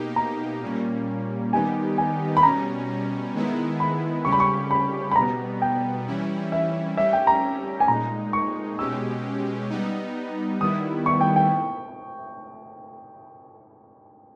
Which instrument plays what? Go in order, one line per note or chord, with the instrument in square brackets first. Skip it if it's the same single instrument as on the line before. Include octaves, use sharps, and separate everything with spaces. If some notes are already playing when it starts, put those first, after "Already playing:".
Already playing: [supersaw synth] B2 A#3 D#4 G4
[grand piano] A#5
[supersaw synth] A#2 G3 A#3 C#4
[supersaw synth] D#3 G3 B3 D#4 G4 [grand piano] G#5
[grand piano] G#5
B5
[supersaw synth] B2 G3 C#4 [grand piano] A#5
[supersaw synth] D#3 G#3 B3 E4
[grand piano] B5
[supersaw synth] C#3 G3 C#4 G4 [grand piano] C#6
[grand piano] B5
C#6
B5
B5
[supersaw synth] B2 G3 B3 [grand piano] A#5
[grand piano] G5
[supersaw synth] E3 G3 C#4 E4
[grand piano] E5
[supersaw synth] G3 C#4 G4 [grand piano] E5
[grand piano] G5
A#5
G#5
[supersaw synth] A#2 G#3 D#4 [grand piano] A#5
[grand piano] C#6
[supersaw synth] B2 G#3 C#4 G4 [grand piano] E6
[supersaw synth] G3 B3 D#4
[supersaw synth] D#3 G3 B3 E4 [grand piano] D#6
[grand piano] C#6
G5
G5